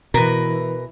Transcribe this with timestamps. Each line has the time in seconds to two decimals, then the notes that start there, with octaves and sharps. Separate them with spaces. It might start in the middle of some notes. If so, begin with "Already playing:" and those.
0.14 B2 E3 A#4 B4